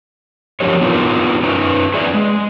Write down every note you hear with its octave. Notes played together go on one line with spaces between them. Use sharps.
F3 F#3 D4 G4 A#4 C#5
B3 D4 D#4 F4 A#4 B4
C#4 D#4 B4
G#4 B4 D5 E5
G#3